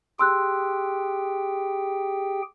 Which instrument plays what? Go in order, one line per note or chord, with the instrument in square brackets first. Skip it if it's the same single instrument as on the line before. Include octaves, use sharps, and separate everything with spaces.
[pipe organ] G4 G#4 G5 [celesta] C6 E6 F#6